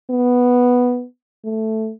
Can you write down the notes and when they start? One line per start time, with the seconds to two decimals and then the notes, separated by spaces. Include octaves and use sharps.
0.10 B3
1.45 A3